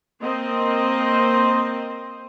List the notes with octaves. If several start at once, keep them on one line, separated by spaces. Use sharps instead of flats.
A#3 C4 C5 D#5